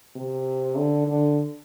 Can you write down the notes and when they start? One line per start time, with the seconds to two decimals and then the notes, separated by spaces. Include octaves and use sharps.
0.16 C3
0.77 D3
1.07 D3